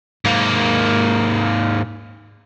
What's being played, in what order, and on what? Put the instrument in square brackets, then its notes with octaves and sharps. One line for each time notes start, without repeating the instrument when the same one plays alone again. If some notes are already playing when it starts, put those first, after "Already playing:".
[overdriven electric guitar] G#2 A#3